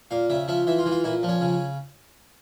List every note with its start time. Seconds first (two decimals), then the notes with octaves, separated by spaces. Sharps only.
0.11 A#2 F5
0.30 C#3 E5
0.48 F3 E5
0.67 E3 E5
0.79 F4
0.86 E3
0.92 F4
1.04 A#2 E4
1.23 F3
1.29 C#4
1.41 C#3